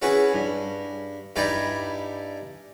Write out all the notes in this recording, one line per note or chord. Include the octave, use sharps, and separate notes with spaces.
C#4 E4 F#4 G#4 B4 C#5
G2
G2 D#4 E4 D5 G5 G#5